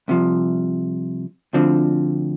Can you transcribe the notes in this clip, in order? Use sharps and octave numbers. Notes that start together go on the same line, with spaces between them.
C2 C3 F3
D2 D3 F3 C4